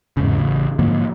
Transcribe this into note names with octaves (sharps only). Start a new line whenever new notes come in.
E2 G#2 C#3
A1 C#3
G#2 D3 F3 A#3